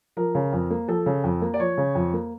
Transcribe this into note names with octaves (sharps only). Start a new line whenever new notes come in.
F3 A#4
C#3
F2
A#3
F3 A4
C#3
F2
A#3
D5
F3 C#5
C#3
F2
A#3